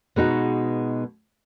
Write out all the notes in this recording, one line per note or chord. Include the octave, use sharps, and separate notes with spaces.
B2 G#3 B3 D#4 F#4